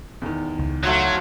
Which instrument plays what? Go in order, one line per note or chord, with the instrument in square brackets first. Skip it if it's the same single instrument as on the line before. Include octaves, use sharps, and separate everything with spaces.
[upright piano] E2 D#3
[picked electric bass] C#2
[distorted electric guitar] F#3 [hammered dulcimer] A3 F4 F#4